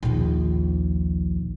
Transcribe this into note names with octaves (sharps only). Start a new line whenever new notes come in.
A#1 D#2